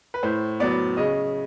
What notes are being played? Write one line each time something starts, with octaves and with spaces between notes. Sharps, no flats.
B4
A2 C5
F#3 B3 D5
C#3 D#5